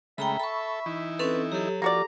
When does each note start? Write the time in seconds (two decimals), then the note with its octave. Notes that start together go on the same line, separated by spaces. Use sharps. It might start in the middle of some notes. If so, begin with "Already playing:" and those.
0.18 C#3 G#3 A3 E5 G5 A#5 B5
0.40 A4 B5 C#6
0.86 E3 D#4 E4
1.19 C4 C#4 A4 B4
1.52 F#3 G4 A4
1.82 F3 A#3 F#4 D5 A#5